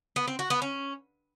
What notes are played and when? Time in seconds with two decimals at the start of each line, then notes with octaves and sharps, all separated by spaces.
0.16 B3
0.28 C4
0.39 F#4
0.50 B3
0.62 C#4